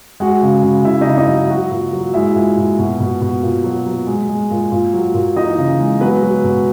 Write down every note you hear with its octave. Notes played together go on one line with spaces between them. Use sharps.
G#3 F#4 F#5
C#3
C#3
C#3 E4 E5
D#4 D#5
C#3
D#4 D#5
F#3
F#3 F#4 F#5
A#2
F#3
G#3 E4 E5
A#2
A#2
B2
B2
B2
A#2
F#3
F#3
G#3
G#3
A#2
A#2
F#3
A#2
E3 D#4 D#5
C#3
G#3
F#3 B3 B4
F#3
B2